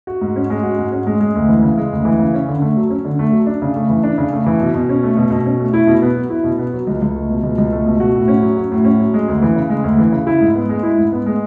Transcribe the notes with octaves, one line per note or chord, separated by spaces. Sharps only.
F#4
G#2
C#4
G#3
F#4
G#2
C#4
G#3
G#3
D2
E3
C#3
G#3
D2
E3
C#3
C#4
D3
A3
F#3
C#4
D3
A3
F#3
D4
C#3
A3
E3
D4
C#3
A3
E3
B2
B2
C#4
A3
B2
B2
C#4
A3
E4
B2
B3
F#3
E4
B2
B3
F#3
C#2
C#2
A3
B2
C#2
C#2
A3
B2
F#4
A2
C#4
F#3
F#4
A2
C#4
F#3
G#3
D2
E3
C#3
G#3
D2
E3
C#3
E4
G#2
B3
G#3
E4
G#2
B3
G#3